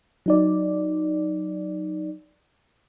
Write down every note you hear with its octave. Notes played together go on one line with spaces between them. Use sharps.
F#3 D#4 D5